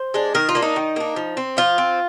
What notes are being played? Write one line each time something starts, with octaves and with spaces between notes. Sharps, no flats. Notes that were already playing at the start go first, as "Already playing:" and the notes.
Already playing: C5
G#3 D4
D#3 A#4
F4
A#3 D4
D#4
D#3
A#3 D4
F3
C4
F3 F4
C4